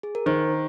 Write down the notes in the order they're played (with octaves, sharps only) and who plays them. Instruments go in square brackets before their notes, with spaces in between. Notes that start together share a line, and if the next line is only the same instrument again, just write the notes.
[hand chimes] G#4
A#4
[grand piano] D#3 [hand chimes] C5